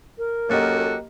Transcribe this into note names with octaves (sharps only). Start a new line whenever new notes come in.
A#4
F#2 A#3 F#4 G4 A4 D#5